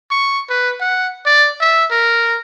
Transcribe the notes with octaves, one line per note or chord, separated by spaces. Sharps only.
C#6
B4
F#5
D5
E5
A#4